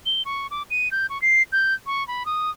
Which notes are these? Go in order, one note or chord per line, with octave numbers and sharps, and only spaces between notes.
G7
C#6
D6
D#7
G6
C#6
C7
G6
C#6
B5
D#6